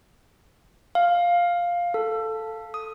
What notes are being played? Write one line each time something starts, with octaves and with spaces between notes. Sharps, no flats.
F5
A4
D#6